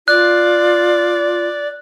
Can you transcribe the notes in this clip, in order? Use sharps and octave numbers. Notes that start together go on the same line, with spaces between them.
F4 D5 F#6